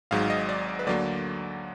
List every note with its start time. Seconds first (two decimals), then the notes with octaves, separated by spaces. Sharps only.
0.11 G#1 G#2 F#3 F5
0.30 D#5
0.49 D5
0.69 D5
0.79 B4
0.86 D2 D3 F#3 A#3 D5